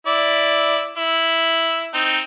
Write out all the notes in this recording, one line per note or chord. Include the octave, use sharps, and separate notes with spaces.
E4 D5
E4
C4 D#4